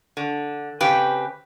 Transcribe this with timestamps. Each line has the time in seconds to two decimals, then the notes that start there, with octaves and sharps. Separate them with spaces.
0.17 D3
0.81 C#3 C4 G4 B4